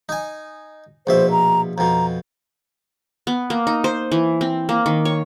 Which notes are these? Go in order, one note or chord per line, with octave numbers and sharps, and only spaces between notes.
D#4 G#5
A#1 B2 C5 E5
A#5
F2 B2 A#5
B3
A#3
D#4
C5
E3
C4
A#3
D#3
C#5